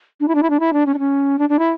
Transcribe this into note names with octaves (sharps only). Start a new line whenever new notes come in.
D4
E4
D4
E4
D4
E4
D4
C#4
D4
C#4
D4
D4
E4